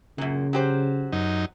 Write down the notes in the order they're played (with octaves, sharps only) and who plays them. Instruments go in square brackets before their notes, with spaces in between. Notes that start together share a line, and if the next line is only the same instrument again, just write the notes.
[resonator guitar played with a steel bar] F#2 A#2 [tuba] C#3
[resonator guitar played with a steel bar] F#3 G4 C5
[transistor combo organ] F#2 D#4